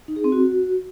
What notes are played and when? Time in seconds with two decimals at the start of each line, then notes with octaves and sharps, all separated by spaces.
0.08 D#4
0.16 G#4
0.24 C4
0.32 F#4